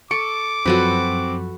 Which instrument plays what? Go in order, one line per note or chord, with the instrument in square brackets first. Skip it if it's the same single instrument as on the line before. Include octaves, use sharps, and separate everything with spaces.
[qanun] A4 [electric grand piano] C#6 C#7 D7 [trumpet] D6
[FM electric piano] F#2 F3 F#3 [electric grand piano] C4 [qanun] F#4 A4 B4